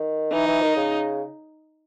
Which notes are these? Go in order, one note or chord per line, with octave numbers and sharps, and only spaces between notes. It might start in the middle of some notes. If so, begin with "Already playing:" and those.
Already playing: D#3
E3 D#4
E3
D#3
C#3